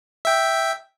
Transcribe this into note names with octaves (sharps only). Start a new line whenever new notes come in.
E5 G5